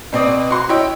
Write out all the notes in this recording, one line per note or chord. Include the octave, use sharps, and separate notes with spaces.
B2 C4 D5 D#6
F#4 C6
E4 C#5 D#5 G5